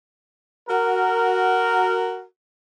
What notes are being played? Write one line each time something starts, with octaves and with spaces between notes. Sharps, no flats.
F#4 A#4